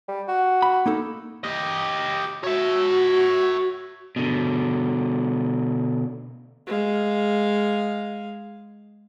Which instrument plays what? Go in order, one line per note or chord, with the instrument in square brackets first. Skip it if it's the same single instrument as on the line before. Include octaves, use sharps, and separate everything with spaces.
[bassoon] G3
F#4
[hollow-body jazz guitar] B5
A#3 D#4 A4
[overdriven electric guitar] G4 D#5
[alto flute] F#4 [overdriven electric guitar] C#5 E5
[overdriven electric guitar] B2 D3
[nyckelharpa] G#3 F5